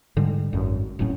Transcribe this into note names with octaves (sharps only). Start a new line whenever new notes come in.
G#2 D3 G3 G#3
G#1 F#2
D1 A2 F#3 C#4